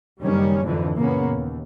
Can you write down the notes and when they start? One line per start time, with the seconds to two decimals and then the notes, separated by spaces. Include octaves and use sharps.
0.21 F#1 D#3 G3 C#4
0.63 F2 G#2 D3 E3
0.97 F#2 A#2 C#3 A#3 B3 C#4
1.33 D#2